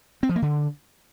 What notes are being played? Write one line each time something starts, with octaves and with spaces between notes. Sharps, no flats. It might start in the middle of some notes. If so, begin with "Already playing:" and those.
C4
F3
A#3
D3